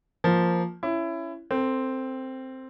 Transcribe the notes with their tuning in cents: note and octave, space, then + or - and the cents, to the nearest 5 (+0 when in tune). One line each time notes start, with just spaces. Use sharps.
F3 +0 A#3 +0
C#4 +0 E4 +20
C4 +0 A4 +25